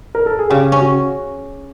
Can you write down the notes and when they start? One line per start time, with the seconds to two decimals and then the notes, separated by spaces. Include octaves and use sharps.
0.15 A#4
0.26 A4
0.39 G#4
0.50 C#3 G4
0.72 C#4
0.80 F#4